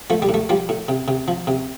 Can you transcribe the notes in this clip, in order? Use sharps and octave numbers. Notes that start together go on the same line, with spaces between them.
F3 A3
G3
A2
A3
F3 G3
A2
C3
C3
F3
C3